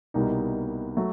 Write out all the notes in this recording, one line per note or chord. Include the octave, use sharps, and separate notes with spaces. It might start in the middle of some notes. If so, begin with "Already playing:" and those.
C2 B2 G3 A#3 D#4
F#3 A3